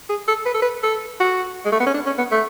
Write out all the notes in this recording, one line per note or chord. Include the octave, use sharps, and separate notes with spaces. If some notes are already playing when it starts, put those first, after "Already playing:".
G#4
A4
B4
A4
B4
A4
F#4
G#3
A3
B3
C#4
D4
C#4
B3
A3